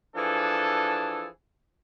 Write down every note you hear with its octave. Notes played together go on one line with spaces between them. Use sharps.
E3 F3 D4 G#4 A4